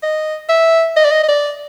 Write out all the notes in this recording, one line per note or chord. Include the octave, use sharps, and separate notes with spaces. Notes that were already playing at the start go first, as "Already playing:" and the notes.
D#5
E5
D#5
D5
D#5
D#5
D5